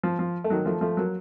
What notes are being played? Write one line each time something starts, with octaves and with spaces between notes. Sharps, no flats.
F3
F3
A3
D#3 F#3
F3 A3
F3 A3
F#3 A#3